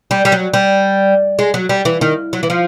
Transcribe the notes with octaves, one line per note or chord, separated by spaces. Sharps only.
G3
G3
F#3
G3
G#3
F#3
G3
E3
D#3
F#3
E3
F3